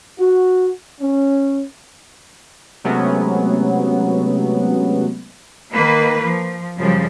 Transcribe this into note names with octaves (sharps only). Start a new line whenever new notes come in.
F#4
C#4
C3 F#3 G#3 A3 B3 C#4
D#3 A#3 B4
F3
F#2 C#3 F3 G3